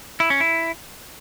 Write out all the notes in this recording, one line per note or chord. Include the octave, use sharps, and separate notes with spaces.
E4
C#4
E4